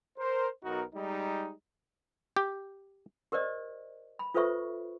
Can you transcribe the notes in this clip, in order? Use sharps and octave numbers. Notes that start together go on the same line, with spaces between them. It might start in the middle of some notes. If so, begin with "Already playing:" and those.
A#4 C5
B1 B3 D#4 F#4 A#4
G3 G#3 D#4
G4
G4 A#4 C5 D5 D#5
B5
F4 A4 B4 C5 E5 C#6